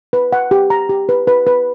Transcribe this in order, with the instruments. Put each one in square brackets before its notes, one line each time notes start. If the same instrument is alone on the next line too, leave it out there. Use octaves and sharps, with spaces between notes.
[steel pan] B4
F#5
G4
A#5
G4
B4
B4
B4